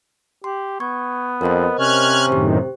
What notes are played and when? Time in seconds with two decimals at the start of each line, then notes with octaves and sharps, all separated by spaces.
0.44 G4 C6
0.80 B3 C#6 G#6
1.41 F2 A#4 C5 D#5
1.79 C3 C#4 F6 F#6 G#6
2.28 F#2 A2 D#3 G4 C5